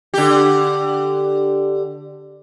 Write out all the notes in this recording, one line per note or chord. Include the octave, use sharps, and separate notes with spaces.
D3 G4